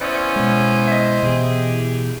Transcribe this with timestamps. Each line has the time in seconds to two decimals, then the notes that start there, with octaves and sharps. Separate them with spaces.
0.01 B3 C#4 E4 C5 D5
0.36 B2 G#3
0.88 D#5 E5
1.23 B2 E3 G4 G#4